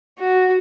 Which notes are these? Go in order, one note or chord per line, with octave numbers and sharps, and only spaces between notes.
F#4